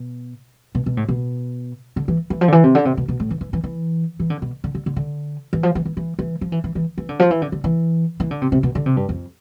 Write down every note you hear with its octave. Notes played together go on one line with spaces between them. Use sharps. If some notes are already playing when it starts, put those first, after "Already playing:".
Already playing: B2
B2
B2
A2
B2
D3
E3
E3
F3
D3
E3
C3
D3
C3
B2
B2
A2
E3
E3
E3
E3
E3
D3
B2
D3
D3
D3
D3
E3
F3
E3
E3
E3
E3
F3
E3
E3
E3
E3
D3
F3
E3
D3
D3
E3
E3
D3
C3
C3
B2
D3
C3
G2
F2